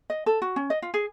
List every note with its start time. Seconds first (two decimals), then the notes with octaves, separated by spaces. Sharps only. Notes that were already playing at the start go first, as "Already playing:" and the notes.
0.10 D#5
0.26 A4
0.42 F#4
0.56 C#4
0.70 D#5
0.82 F4
0.94 G#4